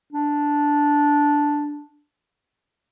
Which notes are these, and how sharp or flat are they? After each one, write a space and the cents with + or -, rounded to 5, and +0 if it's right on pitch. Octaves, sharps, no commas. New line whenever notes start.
D4 -5